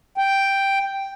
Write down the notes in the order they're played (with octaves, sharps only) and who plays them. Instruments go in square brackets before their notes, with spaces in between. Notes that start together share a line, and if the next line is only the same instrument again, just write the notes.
[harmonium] G5